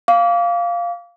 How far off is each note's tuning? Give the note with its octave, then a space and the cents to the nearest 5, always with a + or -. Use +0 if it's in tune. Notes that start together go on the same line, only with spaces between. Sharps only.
F5 +0 D6 -35